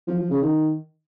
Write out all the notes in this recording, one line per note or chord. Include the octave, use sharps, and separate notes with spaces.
F3
F3
C#3
D#3